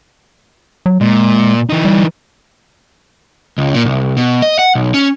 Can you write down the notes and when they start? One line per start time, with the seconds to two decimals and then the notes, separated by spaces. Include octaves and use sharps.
0.86 F#3
1.01 A#2 G#3
1.70 E3 D#4
1.85 G3
3.58 C#2
3.74 A#2
3.86 C2
4.17 B2
4.42 D#5
4.59 F#5
4.75 B1
4.94 C#4